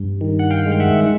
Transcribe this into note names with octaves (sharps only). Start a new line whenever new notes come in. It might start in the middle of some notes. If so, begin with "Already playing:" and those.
Already playing: G2
D#3
F#5
F5 G5
G#3
E5 F#5